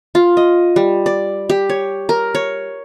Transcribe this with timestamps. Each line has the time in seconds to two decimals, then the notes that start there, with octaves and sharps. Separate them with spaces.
0.15 F4
0.37 D#5
0.76 G3
1.06 D5
1.50 G4
1.70 C#5
2.09 A#4
2.35 C#5